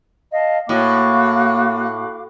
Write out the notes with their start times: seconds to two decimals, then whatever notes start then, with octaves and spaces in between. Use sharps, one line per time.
0.31 D#5 F5 A5
0.69 A2 A#3 F#4 F5 D6